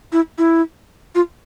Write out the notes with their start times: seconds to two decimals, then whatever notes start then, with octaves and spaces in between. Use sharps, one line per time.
0.12 E4
0.38 E4
1.15 F4